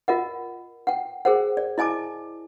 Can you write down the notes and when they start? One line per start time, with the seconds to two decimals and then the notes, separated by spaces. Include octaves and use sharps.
0.08 F4 A#4 D#5 F#5
0.87 F#5 G5
1.25 G#4 A#4 C5 F#5
1.57 D5
1.78 E4 D#5 G#5 A5 D6